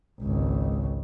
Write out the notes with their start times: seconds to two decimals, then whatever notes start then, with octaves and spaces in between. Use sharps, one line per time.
0.21 G#1 C#2